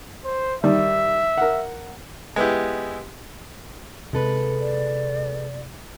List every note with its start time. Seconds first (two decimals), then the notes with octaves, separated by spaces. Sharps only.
0.25 C5
0.64 D#3 G3 E5
1.38 A#4 F#5
2.36 G#3 B3 E4 G4
4.13 C3 G#3 A4 B4
4.60 D5